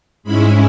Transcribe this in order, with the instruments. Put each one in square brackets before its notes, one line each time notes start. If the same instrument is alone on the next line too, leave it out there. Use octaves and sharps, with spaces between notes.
[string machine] G#2 G#3 C#4 E4 B5